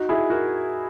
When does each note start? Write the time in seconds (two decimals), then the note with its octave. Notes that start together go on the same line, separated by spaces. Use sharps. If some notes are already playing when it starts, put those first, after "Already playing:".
Already playing: D#4 F#4
0.09 E4 G#4
0.30 F#4 A#4